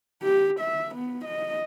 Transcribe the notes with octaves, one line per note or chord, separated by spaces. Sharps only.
G4
E5
B3
D#5